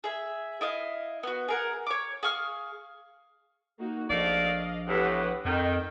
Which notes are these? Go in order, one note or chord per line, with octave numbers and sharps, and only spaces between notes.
G#4 E5
E4 D#5 F5
B3 F#4
G#4 A#4 F#5
C#5 D6
G#4 F5 C#6 F6
A#3 D#4 F#4
A#1 A3 A#3 D5 D#5 F5
E2 A2 G4 B4 F#5
F2 D#3 G5